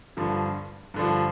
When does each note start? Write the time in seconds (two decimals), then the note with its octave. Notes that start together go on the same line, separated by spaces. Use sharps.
0.17 G2 D3 F3
0.94 G2 D3 F3